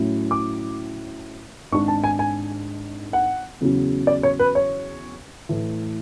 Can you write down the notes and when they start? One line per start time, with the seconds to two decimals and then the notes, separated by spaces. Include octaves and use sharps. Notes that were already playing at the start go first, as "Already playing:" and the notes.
Already playing: A2 F#3 C#4 E4
0.31 D6
1.72 G#1 G#2 G#3 D4 C#6
1.88 A5
2.04 G#5
2.19 G#5
3.13 F#5
3.61 E2 C#3 F#3 C#4
4.07 D5
4.23 C#5
4.39 B4
4.55 C#5
5.49 A2 E3 A3